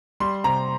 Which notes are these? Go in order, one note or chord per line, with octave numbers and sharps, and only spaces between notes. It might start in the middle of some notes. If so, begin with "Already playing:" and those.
G3 C6
C3 A#5